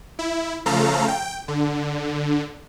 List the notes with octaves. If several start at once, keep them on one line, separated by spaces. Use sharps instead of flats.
E4
C#3 F3 A3 A4 F5 A#5
G5
D3